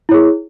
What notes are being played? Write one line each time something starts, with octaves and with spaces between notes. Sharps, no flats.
E4 G#4 C#5